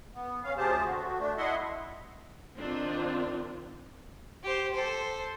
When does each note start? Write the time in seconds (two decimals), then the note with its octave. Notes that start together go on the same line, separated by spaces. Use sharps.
0.14 B3
0.44 C#4 F5
0.57 D2 C3 G4 G#4 C5 A5
0.84 D3 F#4
1.19 A3 D4
1.37 E4 D#5 E5 F#5 C6
2.58 D#3 C4 D4 F4
4.43 G4 C5
4.74 A4 C5